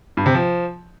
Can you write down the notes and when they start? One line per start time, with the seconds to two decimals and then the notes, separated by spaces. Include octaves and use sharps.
0.17 G2
0.26 C3
0.34 F3